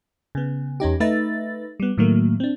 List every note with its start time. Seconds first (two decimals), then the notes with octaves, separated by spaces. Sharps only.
0.35 C#3 B3
0.80 E2 C#4 D#4 G4
1.00 A3 D#4 B4 E5 A6
1.80 G3 B3
1.98 A2 D#3 F#3 A3 A#3
2.40 C4 D4